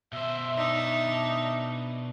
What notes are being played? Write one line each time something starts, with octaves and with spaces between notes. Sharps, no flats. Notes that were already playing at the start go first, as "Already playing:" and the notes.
B2 C5 E5
D4 D#4